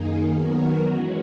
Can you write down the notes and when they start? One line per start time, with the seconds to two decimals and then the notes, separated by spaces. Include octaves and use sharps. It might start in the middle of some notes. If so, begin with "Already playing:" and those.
Already playing: F#2 D#3 A#3 D#4 G#4
0.29 D#3 F#3 B3 F#4 A#4
0.83 E3 G#3 C#4 F#4